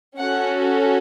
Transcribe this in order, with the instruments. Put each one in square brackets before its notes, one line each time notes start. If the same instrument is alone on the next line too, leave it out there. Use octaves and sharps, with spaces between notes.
[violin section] C#4 F#4 A4 F#5